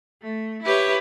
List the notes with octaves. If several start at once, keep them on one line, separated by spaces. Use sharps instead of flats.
A3
E4 G4 B4 C#5